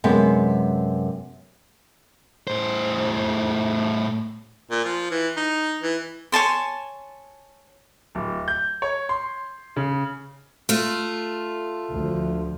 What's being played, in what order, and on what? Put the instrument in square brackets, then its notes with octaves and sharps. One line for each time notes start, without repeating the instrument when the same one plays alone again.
[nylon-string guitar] F#2 C3 G#3 B3
[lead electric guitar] A2 C5
[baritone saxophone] A#2
F3
E3
D#4
E3
[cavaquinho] C#5 G#5 A5 C6
[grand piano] D1
G6
C#5
C6
C#3
[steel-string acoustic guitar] A3 F4
[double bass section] D2 F3